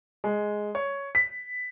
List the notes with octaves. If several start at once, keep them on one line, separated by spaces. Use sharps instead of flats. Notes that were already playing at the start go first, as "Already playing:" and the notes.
G#3
C#5
B6